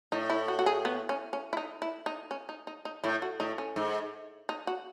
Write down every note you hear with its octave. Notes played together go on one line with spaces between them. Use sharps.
A2 D#4
E4
F#4
F#4
G#4
B3
C#4
C#4
E4
D#4
E4
D#4
C#4
D#4
D#4
D#4
A2 E4
F#4
A2 D#4
C#4
G#2
D#4
F#4